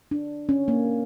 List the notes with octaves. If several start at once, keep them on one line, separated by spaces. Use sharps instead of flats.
D4
C#4
A#3